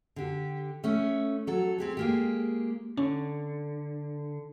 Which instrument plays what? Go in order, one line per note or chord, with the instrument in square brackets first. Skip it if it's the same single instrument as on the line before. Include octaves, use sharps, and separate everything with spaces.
[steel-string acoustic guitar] D3 G4
A3 C#4
F#3 A4
C4 G4 G#4
G#3 A#3 G4
[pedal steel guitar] D3 [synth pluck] C#4